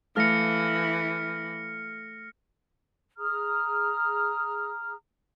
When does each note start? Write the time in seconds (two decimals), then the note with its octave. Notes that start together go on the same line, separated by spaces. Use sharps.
0.16 E3 A3 A4 F5 F6 A#6 C#7
3.18 G#4 A#5 D#6 F6